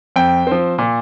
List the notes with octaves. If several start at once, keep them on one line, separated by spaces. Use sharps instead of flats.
F2 G5
F3 C4
A#2